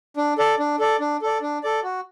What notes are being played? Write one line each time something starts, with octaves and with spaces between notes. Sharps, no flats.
D4
A4 D5
D4
A4 D5
D4
A4 D5
D4
A4 D5
F#4